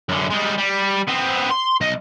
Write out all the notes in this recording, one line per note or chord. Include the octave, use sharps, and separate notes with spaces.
F#2 D3
G3 G#3
G3
B3 C4
C6
B1 D#5